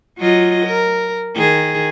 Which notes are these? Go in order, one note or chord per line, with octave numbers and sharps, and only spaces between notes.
F#3 F4 D#5
A#4
D#3 G#4